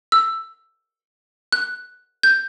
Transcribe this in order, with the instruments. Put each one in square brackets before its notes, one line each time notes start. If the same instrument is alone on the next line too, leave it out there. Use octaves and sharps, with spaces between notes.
[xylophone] E6
F#6
G6